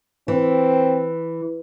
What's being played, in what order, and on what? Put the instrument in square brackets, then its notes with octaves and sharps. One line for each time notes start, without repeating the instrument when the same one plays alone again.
[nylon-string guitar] E3 [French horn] C4